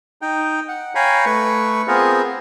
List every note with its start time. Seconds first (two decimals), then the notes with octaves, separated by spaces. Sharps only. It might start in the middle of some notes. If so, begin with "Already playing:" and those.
0.22 D#4 G5
0.68 F#5
0.95 C#5 F5 G5 G#5 A#5 B5
1.26 A3 B4 C#6
1.88 B3 C4 F4 G#4 A#4